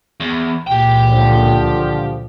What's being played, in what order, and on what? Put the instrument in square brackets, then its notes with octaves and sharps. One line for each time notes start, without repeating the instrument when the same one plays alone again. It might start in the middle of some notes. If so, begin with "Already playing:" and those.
[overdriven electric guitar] E2
[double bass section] C#2 A#2 E3 [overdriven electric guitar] G4 G5
[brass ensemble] D3 F3